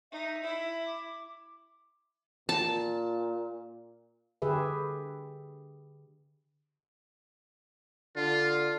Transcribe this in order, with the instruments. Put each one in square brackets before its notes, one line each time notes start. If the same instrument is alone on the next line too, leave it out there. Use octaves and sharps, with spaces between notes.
[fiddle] D#4 [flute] E5
[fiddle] E4
[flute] D6
[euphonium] A#2 [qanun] A5
[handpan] D3 G4 G#4 B4 E5
[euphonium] D3 [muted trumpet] F4